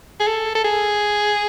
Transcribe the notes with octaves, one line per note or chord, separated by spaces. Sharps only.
G#4
A4
A4
G#4